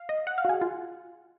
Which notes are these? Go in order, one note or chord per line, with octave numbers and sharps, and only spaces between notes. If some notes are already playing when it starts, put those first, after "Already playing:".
Already playing: F5
D#5
F#5
F5
F#4
G#4
F4